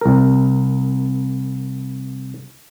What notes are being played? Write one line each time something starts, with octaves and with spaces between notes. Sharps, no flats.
C2 A#4